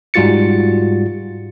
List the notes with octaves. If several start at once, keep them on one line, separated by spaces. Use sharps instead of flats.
G#2 G3 F4 F#4 A6 C#7